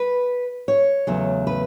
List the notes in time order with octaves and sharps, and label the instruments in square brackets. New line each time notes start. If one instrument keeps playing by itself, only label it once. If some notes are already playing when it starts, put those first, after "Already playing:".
Already playing: [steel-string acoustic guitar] B4
C#5
E2 C#3 F#3 A3
B4